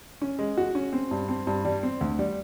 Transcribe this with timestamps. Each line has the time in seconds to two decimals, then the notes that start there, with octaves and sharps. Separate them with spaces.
0.21 C#4
0.39 G#3
0.57 F#4
0.75 C#4
0.93 C4
1.11 G2
1.28 C4
1.47 G2
1.65 G3
1.83 C4
2.01 D2
2.19 G3